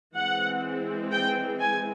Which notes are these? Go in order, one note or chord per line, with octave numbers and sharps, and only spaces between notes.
E3 G#3 C4 F#5
G5
G#5